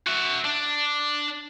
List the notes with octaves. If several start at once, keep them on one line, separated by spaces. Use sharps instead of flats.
F#4 E5
D4